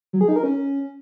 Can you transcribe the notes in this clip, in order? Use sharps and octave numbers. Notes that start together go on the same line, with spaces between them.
F#3
G#4
D#4
A#4
C#4